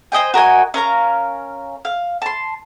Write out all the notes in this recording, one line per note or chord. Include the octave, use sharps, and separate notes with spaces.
C5 D#5 G5 G#5
F#4 A#4 D#5 G#5
C#4 A#4 F5 A#5
F5
A5 C6